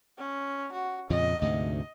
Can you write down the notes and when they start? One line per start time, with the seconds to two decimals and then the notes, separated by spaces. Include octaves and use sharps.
0.18 C#4
0.73 F#4
1.10 F2 A#2 C#3 D#5
1.42 D2 G#2 C3 D#5